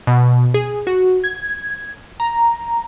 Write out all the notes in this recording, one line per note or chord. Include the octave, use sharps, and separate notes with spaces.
B2
G#4
F#4
G#6
A#5